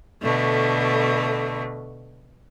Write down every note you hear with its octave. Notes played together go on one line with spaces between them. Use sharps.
B2 D3 A3